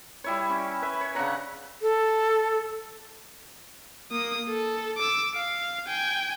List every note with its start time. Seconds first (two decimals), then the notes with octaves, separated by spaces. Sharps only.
0.24 G3 E4 C#5
0.50 C#4
0.82 B4 E5
1.01 C#5
1.15 C#3 D4 F#5 A#5
1.82 A4
4.11 A#3 D#6
4.49 A4
4.98 D6 E6
5.35 F5
5.88 G5 G#5